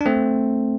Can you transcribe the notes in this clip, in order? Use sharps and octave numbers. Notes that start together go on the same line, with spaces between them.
D4
A3 C4